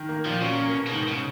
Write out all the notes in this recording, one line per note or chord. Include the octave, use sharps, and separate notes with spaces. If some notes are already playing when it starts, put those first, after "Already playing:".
Already playing: D#3
A#3
A#2 F3
C#3 F#3
A#3
B2
C#3
G#2 D#3
C#3